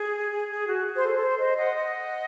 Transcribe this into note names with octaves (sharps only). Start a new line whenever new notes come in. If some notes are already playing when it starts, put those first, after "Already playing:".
Already playing: G#4
G#4
G#4
F#4
G#4
C5
A4
A4
C5
C5 D#5
D#5 F#5
D#5 F#5